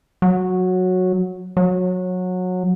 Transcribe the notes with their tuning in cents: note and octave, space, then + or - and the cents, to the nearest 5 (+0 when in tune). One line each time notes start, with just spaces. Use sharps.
F#3 -10
F#3 -20